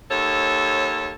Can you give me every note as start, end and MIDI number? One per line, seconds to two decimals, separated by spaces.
0.10 1.13 39
0.10 1.13 69
0.10 1.13 73